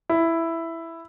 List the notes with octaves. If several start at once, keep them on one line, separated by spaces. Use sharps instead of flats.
E4